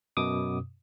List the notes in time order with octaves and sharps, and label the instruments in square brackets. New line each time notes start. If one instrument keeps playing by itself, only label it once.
[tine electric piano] F#2 B2 D6 D#6